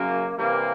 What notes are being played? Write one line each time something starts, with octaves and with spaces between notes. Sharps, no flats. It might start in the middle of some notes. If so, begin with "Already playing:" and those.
Already playing: F#2 C#3 F#3 A#3
C3 E3 G3 A#3